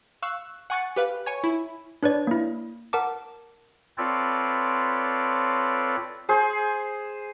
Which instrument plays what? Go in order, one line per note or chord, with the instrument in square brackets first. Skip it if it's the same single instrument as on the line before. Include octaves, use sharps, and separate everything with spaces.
[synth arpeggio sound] F5 C#6 E6 F#6
F#5 G#5 C#6 F#6 A6 C#7
G4 B4 F5
C#5 G#5 C#6
E4
[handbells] D4 B4 C#5 D5
A#3 E4
A#4 F#5 A5 D6
[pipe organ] C4 F4 A4 B4 C#5 D5
[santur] G#4 C5